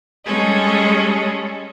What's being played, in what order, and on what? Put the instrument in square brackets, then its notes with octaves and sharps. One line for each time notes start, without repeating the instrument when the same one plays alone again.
[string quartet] G3 G#3 C#4 G#4 A4 D#5